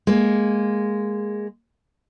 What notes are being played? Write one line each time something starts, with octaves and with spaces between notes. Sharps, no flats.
G#3 A#3